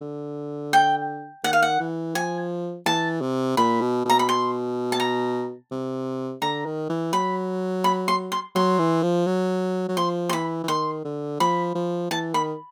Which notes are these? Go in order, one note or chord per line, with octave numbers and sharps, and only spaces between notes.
D3
G5
D#3 F#5
F5
F#5
E3
F3 G#5
E3 A5
C3
A#2 B5
B2
B2 A#5
B5
C6
A5
A#5
C3
D3 A#5
D#3
E3
F#3 B5
B5
C6
C6
F#3 C6
E3
F3
F#3
F#3
F3 C6
C6
E3 B5
E3
D#3 C6
D3
F3 B5
F3
E3 A5
D#3 B5